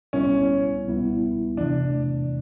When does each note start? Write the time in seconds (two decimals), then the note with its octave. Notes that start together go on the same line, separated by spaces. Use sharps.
0.13 C#2 B2 G3 B3 C#4 E4
0.85 C#2 B2 G3 B3 E4
1.57 E2 C3 E3 A3 D4